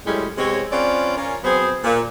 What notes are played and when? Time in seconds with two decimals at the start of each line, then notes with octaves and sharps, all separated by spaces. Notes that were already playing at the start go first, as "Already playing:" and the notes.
0.06 F#2 A2 G3 G#3 C#4 E4
0.38 C3 G#3 B3 C4 C#5
0.72 C4 C#4 F4 B4 D5
1.17 C#4 F4 A#4
1.44 F#3 B3 C4 G#4 C5
1.84 A#2